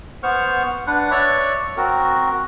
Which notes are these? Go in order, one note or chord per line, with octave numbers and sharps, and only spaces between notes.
B3 C5 C#6 F6
D4 B4 F#5
C#5 D5 E5 C#6
C4 F#4 A#4